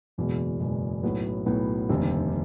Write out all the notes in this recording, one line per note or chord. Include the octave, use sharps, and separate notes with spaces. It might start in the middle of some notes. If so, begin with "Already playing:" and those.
F#1 E2 B2 G#3
F#1 E2 B2 G#3
B1 A2 F#3 B3
B1 A2 F#3 B3
F1 D#2 D3 G3 C4